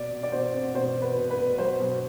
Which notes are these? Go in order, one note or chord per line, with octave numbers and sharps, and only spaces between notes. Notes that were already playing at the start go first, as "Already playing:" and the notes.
Already playing: B2 D5
B2
D5
B2 C5
C4
B2 C5
B2
B4
B2
B4
B2
F#3 C5
B2